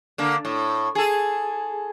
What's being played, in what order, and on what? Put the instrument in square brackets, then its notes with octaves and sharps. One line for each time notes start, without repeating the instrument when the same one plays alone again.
[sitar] D3 A#3
A2
G#4 A4